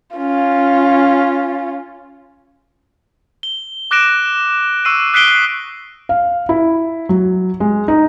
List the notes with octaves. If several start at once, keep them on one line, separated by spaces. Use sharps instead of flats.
C#4 F4
G7
D6 F#6 A#6 D7 E7
C#6 E6 C7 D#7
D#6 F#6 B6 C7 D7 G7
F5
E4
F#3
G#3
D#4